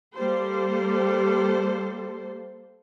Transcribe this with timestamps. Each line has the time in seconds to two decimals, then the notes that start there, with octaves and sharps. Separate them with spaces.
0.16 G3 A#3 A4 C5